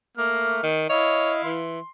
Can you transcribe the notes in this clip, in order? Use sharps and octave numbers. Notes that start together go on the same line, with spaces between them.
A3 A#3 F6
D#3
E4 C#5 D#5 F5
E3 C6